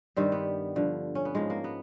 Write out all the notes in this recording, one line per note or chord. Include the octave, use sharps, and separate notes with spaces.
G2 D#3 G3 C4
B3
G2 D3 F3
C#4
B3
G#2 F3 G#3
A#3
B3